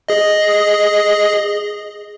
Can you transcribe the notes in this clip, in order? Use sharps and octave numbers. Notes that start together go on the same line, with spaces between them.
G#4 D#5